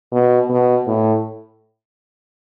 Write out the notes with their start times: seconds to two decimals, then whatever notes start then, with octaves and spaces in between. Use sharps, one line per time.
0.12 B2
0.50 B2
0.87 A2